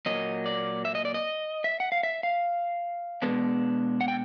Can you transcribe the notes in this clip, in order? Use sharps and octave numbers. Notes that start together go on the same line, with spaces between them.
A#2 F#3 A#3 D#5
D5
E5
D#5
D5
D#5
E5
F#5
F5
E5
F5
B2 G#3 B3 D4
F#5
G5